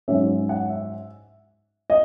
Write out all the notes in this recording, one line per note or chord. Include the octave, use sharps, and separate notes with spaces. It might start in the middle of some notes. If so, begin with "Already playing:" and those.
G#2 F#3 C#4 E5
F#5
E5
D#5